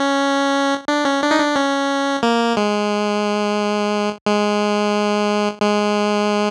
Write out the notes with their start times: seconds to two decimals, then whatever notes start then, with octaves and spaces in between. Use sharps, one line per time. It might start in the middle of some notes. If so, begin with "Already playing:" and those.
Already playing: C#4
0.88 D4
1.05 C#4
1.22 D4
1.31 D#4
1.39 D4
1.56 C#4
2.23 A#3
2.57 G#3
4.26 G#3
5.62 G#3